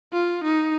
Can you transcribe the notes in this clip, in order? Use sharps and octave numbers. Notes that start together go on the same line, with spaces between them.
F4
D#4